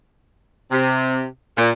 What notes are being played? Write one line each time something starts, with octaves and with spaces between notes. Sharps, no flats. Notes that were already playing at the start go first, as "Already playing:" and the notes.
C3
A#2